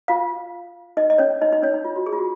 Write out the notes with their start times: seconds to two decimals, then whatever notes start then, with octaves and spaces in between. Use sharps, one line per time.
0.08 F4 F5
0.97 D#4 D#5
1.10 D#5
1.18 C#4 C#5
1.41 D#4 D#5
1.52 D#4 D#5
1.63 C#4 C#5
1.74 D#4
1.85 F4
1.96 F#4
2.06 G#4
2.13 F4
2.18 F#4